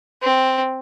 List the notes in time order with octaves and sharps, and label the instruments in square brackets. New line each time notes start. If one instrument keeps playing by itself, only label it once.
[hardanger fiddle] C4